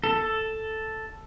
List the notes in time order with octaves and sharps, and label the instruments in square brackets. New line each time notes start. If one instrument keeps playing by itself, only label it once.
[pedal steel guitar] A4